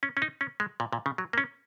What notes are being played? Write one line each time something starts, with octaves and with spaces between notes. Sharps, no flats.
C#4
C#4
D#4
C#4
G#3
A#2
A#2
C#3
F#3
A#3
C#4